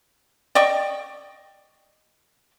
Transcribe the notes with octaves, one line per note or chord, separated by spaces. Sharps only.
D5 D#5 G5 C#6